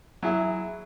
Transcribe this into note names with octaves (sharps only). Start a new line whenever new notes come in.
F#3 E4 G#4 E5